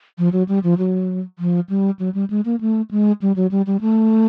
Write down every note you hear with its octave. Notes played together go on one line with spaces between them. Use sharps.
F3
F#3
G3
F3
F#3
F3
G3
F#3
G3
G#3
A#3
A3
G#3
G3
F#3
G3
G3
A3